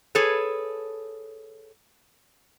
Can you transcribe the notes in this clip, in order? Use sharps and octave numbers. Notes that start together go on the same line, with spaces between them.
G#4 A4 B4 C#5